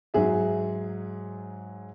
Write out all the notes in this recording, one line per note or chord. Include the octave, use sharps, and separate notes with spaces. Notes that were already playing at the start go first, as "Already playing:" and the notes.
G#2 F#3 G#4 E5